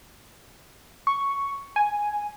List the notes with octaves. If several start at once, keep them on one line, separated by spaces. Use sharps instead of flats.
C#6
G#5